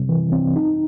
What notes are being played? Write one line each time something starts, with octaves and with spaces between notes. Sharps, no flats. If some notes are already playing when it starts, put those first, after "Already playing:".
Already playing: C3 G3 C4
E3
C4
D#4